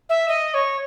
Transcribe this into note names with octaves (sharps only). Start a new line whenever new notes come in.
E5
D#5
C#5